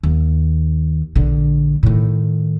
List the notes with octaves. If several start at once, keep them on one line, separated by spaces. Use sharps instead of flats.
D#2
A#1 D3
A2 D#3